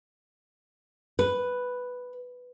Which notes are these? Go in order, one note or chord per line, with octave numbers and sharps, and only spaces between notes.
B4